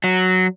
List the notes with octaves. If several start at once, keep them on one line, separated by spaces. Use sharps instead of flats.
F#3